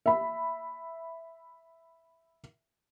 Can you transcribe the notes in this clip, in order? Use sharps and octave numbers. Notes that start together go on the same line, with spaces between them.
E5 B5